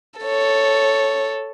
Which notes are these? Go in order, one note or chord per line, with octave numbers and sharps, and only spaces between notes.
A4 C#5